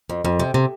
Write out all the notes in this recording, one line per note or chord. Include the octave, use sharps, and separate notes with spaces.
F2
F2
C3
C3